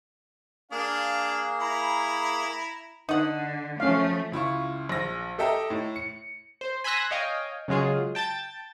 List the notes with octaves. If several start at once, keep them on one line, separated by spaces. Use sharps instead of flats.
A#3 D4 G#4 F5
E4 A#5 B5
D3 D#4 F#5
F3 A3 C#4 F5
C#2 E4 F4 C#6
A#1 A#6
G4 A4 D#5 E5 G5 A#5
A2
C#7
C5
G#5 B5 C6 E6 F#6 A#6
C#5 D#5 F5 G5 G#5
C#3 F#3 G#3 F4 G#4
G5 A5 G6 A6